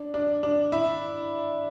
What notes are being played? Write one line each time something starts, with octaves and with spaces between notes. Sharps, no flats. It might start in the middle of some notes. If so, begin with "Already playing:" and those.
Already playing: D4
D4
D4
E4